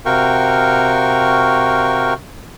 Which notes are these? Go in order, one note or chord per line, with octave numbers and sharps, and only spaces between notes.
C3 F#4 A#4 F5 G5 C#6